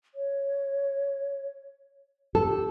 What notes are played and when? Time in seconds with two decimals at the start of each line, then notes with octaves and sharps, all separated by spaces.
0.15 C#5
2.35 G4 A4